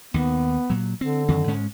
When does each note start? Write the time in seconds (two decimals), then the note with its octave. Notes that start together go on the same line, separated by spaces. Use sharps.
0.14 D#2 D#3 B3
0.70 A#2 F#3
1.01 D3 C4
1.28 F#2 D#3 C4
1.47 G#2 G#3 C#4